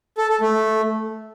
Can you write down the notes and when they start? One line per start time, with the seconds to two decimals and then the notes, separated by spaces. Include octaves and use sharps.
0.18 A4
0.29 A4
0.41 A3